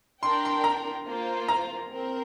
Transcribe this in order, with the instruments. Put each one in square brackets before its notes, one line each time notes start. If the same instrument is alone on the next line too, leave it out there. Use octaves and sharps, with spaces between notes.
[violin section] D4 A#4 G5 [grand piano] C6
[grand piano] C6
A#5
[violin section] A#3 F4 C5
[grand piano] A#5
[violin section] C4 A#4